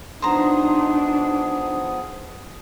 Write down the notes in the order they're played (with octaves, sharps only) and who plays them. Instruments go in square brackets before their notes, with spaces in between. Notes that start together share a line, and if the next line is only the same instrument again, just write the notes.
[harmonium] F3 B3 G#4 [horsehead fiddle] D4 D#4 [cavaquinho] C5 A#5